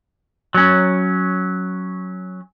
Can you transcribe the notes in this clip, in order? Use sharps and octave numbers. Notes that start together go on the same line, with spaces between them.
F#3 C#4